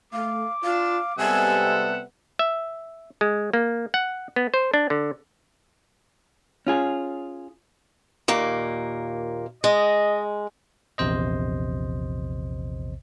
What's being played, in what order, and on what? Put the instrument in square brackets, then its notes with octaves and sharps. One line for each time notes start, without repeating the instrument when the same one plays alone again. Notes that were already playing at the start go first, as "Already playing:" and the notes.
[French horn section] A3 [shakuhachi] F5 [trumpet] D6
[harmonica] D4 [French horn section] F4 [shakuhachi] F5
[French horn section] C3 G3 B3 [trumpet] G#3 [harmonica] A4 E5 F#5 [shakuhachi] G#5
[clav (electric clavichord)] E5
G#3
A#3
F#5
B3
C5
D4
D3
[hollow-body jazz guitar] C#4 F4 G#4
[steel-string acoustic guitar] D#2 A#2 A#3
[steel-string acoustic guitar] G#3 [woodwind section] D#5
[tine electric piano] A#1 E2 C3 C5 D#5